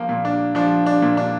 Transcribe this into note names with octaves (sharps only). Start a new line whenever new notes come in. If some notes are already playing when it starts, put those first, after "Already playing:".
Already playing: F3 A#3
A#2
D4
F3 D4
D4
A#2
D4